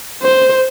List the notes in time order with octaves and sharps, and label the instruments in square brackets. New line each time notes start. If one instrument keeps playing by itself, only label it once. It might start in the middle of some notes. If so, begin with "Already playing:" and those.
[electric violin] C5